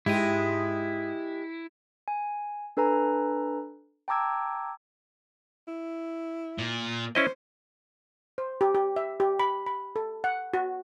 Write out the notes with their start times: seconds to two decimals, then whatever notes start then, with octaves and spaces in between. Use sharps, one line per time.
0.06 G#2 G#3 E4 G4 D#6
2.08 G#5
2.77 D4 A4 B4 G#5 A#5
4.08 G5 A5 A#5 D6 E6 G#6
5.67 E4
6.59 A#2
7.15 C#4 E4 C5 D#5
8.38 C5
8.61 G4
8.75 G4
8.96 E5
9.20 G4
9.40 B5
9.66 B5
9.96 A4
10.24 F#5
10.54 F#4